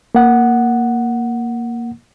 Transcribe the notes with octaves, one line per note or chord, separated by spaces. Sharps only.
A#3 F#5